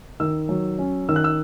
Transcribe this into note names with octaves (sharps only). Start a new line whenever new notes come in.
D#3 E6
F#3
C#4
D#3 E6
F#6
E6